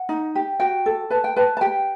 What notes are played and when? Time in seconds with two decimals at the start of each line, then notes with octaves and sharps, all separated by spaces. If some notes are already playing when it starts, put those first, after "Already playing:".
Already playing: F#5
0.09 D#4
0.35 G4
0.60 F#4 G5
0.86 A4
1.10 B4 A5
1.24 G5
1.36 B4 A5
1.57 A5
1.61 G4 G5